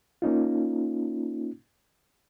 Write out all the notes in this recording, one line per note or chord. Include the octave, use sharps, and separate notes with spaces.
A#3 C#4 D#4 F4